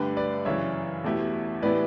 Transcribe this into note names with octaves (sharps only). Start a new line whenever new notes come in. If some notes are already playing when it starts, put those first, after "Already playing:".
Already playing: G2 D3 A3 G4 B4
B4 D5
F#2 C#3 E3 C#5 E5
E2 B2 A3 E4 G4
A2 E3 B3 E4 G4 B4 D5